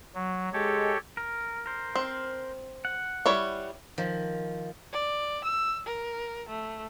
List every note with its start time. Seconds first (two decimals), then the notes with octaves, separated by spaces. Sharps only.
0.15 F#3
0.53 G#3 G4 A4 C#5
1.17 A#4
1.66 A#4 C5
1.96 C4
2.85 F#5
3.26 G3 E4 C#5
3.98 D#3 F3
4.93 D5
5.44 E6
5.87 A#4
6.49 A3